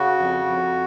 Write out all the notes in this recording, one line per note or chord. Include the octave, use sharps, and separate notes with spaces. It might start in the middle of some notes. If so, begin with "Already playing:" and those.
Already playing: C#3 F#4
F2
F2